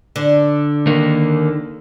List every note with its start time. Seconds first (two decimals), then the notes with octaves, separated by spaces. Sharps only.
0.16 D3
0.87 D#3 A#3